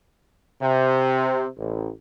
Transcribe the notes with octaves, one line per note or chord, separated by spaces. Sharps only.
C3
A1